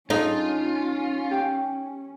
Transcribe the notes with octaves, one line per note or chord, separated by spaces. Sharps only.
C#4 D#4 F4 G#4 A4
G4 G5